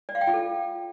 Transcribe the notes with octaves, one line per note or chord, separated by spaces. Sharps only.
D5
F5
G5
F4
A4